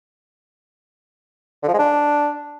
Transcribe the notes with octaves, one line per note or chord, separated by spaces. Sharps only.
D3
F3
G#3
D4